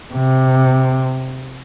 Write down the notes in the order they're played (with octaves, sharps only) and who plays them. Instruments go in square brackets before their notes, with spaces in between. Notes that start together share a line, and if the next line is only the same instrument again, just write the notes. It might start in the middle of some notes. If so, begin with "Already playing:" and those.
[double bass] C3